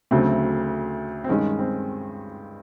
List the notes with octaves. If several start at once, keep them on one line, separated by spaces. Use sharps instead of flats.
D2 C#3 F#3 A3 C4
C4
G2 D#3 G#3 C#4
C4